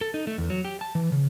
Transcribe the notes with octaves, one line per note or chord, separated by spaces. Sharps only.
A4
D#4
A3
E2
F#3
G4
A5
E3
C#3